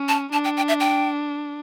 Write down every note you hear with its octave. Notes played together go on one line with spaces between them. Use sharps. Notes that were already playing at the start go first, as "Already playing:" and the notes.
Already playing: C#4
A5
D4 A5
G5
G5
E5
G5